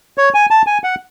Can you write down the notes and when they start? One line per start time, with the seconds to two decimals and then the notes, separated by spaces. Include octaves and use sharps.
0.18 C#5
0.34 G#5
0.51 A5
0.67 G#5
0.84 F#5